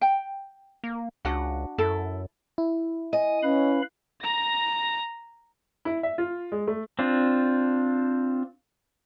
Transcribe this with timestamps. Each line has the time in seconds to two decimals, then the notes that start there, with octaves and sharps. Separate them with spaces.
0.01 G5
0.84 A#3
1.25 C#2 D4 F#4 F#5
1.78 F#2 E4 A4
2.58 E4
3.13 D#5 G#5
3.43 C#4 B4 F5 B5
4.21 A#5 A#6
5.85 E4
6.03 E5
6.18 F4
6.52 G#3
6.67 A3
6.99 C4 D4 F4